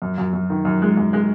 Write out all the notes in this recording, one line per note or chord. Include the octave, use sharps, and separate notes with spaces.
F#2
F#2
F#2
D#3
F#2
G#3
F#2
G#3